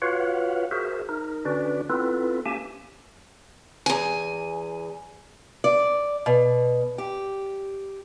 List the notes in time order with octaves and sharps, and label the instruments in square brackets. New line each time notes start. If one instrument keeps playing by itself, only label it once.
[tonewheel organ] F4 F#4 B4 C#5 F5 F#5
F#4 G#4 A#4 C5 E5
D#4 A#4
D3 C#4 D4 F#4 B4 D5
B3 C4 E4 F4 A4 B4
A#3 C#4 G4 E5 G#5 A5
[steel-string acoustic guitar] E2 G#5
D5
B2
G4